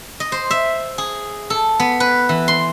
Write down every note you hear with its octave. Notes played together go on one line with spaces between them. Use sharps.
D#5
C5
E5
G#4
A4
B3
B4
E3
C6